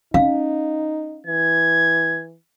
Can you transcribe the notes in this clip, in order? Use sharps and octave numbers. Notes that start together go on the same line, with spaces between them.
C#4 D#4 F5
E3 G#6